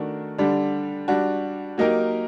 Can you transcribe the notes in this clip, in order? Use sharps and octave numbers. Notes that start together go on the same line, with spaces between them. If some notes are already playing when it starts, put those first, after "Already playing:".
Already playing: D#3 A3 D4 F#4 A#4
D3 G3 D4
G3 D4 F#4
F#3 A#3 D#4 G4 A#4